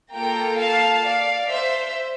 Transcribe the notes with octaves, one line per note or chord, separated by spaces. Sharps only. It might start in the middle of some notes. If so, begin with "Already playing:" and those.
A#3 F4 A4 G5 A#5
F5 A5
D5 F5
C5 E5